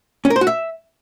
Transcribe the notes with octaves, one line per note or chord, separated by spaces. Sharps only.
C#4
A#4
C5
F#4
E5